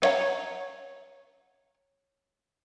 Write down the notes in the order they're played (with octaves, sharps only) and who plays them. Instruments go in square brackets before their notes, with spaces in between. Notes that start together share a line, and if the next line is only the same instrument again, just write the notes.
[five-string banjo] B3 C#5 E5 F#5 A#5